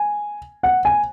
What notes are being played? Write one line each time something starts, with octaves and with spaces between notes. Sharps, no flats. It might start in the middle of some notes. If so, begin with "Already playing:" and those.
Already playing: G#5
F#5
G#5